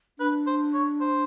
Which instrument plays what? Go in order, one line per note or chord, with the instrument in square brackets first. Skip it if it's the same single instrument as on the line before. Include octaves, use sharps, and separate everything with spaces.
[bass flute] D4 [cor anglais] B4
[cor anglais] C5
C#5
C5